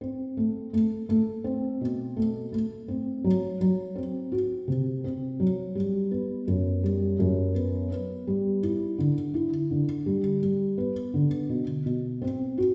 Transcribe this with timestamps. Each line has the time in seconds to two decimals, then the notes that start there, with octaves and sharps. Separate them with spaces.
0.01 C4
0.37 A3
0.73 A3
1.09 A3
1.44 C4
1.81 B2
2.17 A3
2.52 A3
2.88 C4
3.24 F#3
3.61 F#3
3.95 C4
4.32 F#4
4.68 C3
5.04 C4
5.40 F#3
5.75 G3
6.11 B3
6.47 F#2
6.83 G3
7.19 F#2
7.55 B3
7.91 B3
8.27 G3
8.63 E4
8.98 D3
9.34 E4
9.71 D3
10.06 G3
10.42 G3
10.78 B3
11.14 D3
11.49 B2
11.86 B2
12.22 C4
12.58 F#4